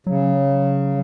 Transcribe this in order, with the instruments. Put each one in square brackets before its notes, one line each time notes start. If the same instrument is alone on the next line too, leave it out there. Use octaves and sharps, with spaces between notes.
[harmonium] C#3 [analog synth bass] F#3